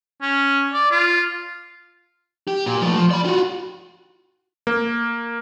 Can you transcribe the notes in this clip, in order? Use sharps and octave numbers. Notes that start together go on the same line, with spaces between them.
C#4
D5
F4
G4
A#2
F3 A3
F3
D5 B5
F4 F#4
A#3